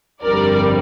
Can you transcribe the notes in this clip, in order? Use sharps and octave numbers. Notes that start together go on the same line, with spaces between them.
G1 F2 D3 G3 A#4 D5